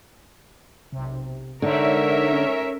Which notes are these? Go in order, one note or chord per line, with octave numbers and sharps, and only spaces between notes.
B1 C3
D3 G#3 D#4 A#4 C#5 D5 E5
C#4